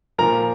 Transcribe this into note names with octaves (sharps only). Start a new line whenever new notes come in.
A#2 F3 A#4 A#5